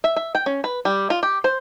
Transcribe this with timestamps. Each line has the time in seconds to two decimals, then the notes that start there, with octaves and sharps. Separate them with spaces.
0.04 E5
0.16 E5
0.35 G5
0.46 C#4
0.64 B4
0.85 G3
1.10 F4
1.23 G4
1.44 C5